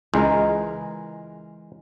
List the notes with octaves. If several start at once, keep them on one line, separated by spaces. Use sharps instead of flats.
C#2 E3 G#3 A#4